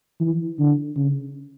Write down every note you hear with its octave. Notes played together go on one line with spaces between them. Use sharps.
E3
D3
C#3